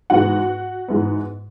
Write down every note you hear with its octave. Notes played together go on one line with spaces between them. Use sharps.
G#2 E3 G#3 B3 F#4 F#5
G#2 E3 G#3 B3